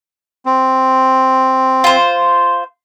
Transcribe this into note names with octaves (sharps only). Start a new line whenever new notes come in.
C4
F4 C5